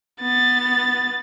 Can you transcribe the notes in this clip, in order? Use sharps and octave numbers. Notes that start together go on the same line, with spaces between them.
B3 A6